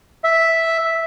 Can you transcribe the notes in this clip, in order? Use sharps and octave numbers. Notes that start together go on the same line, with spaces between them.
E5